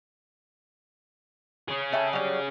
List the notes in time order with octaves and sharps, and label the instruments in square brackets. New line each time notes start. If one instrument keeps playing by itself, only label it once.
[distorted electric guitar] C#4 G#4
[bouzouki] A4 E5 G5
F#3 G3